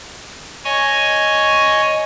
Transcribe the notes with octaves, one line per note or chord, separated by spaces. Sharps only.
C#5 D#5 G#5 C#6